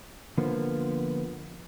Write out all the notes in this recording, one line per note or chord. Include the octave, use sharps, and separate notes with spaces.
D3 F3 A#3 B3